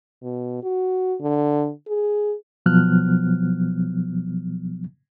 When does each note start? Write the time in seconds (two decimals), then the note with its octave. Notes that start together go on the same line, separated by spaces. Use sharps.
0.23 B2
0.63 F#4
1.20 D3
1.88 G#4
2.66 B2 F3 F#3 B3 F6 F#6